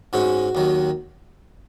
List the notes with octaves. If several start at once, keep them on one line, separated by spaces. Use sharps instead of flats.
G#2 G#3 C#4 F#4
D#2 D#3 F#3